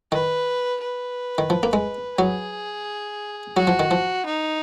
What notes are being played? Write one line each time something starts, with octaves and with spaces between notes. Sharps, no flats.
D#3 B4
B4
D#3
F3
A#3
G#3
F#3 G#4
F#3 F#4
F3
D#3
F3
D#4